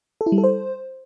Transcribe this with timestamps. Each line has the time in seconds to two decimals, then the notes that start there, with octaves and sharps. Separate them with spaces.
0.21 A4
0.26 E4
0.32 G3
0.38 A4
0.44 C5